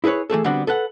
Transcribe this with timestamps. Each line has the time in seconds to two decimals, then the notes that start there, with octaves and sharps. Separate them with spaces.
0.04 E4 G#4 A#4 B4 C#5
0.30 E3 A3 G#4 A4
0.44 D3 G3 B3 C4 D4 F#4
0.67 A4 B4 F#5